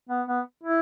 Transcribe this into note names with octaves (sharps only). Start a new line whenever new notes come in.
B3
B3
E4